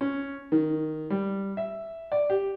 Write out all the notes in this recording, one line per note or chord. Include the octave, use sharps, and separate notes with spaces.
C#4
D#3
G3
E5
D5
G4